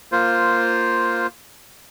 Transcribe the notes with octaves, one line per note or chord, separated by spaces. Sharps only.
A#3 F4 C5